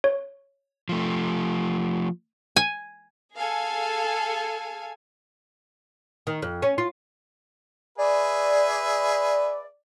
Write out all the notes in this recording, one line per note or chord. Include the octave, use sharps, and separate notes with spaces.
C#5
F3 A3
G#5
G#4 A4 F5 G#5
D#3
F2
C#4
F4
G#4 B4 D5 E5